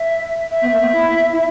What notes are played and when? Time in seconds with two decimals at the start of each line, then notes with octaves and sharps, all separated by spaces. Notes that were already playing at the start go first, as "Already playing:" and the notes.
Already playing: E5
0.51 E5
0.62 B3
0.72 A#3 E5
0.81 B3
0.93 E4
1.33 E4